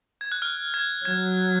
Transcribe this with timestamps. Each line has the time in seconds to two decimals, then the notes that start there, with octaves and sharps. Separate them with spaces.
0.21 G#6
0.32 F#6
0.42 F6
0.74 G#6
1.05 F#3 G#6